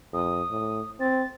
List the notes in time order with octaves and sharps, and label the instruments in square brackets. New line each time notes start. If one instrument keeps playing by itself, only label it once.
[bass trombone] F2 [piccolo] D#6
[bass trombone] A2
[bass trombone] C4 [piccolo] A6